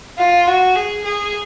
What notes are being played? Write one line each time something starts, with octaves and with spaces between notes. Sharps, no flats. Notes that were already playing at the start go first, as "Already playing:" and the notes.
F4
F#4
G#4
G#4